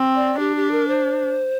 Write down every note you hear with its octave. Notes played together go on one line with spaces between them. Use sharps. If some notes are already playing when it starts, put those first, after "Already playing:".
Already playing: C4
D5
D4 G4
G4
A#4
C5